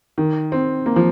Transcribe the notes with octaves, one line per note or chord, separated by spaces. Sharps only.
D#3
C4
A#3
F3